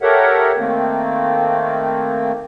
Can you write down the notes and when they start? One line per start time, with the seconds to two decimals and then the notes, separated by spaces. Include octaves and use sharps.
0.02 G4 A4 A#4 C#5 E5 F#5
0.58 D#3 A3 A#3 C4